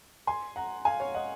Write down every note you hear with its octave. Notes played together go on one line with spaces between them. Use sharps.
G#5 C6
F#5 A#5
F5 G#5
C#5 F5
D#5 F#5